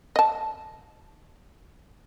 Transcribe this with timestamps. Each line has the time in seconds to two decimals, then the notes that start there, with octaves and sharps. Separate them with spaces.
0.16 D#5 A5